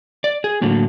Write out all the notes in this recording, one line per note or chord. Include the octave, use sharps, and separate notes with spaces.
D5
G#4
A2 D3 F#3 A#3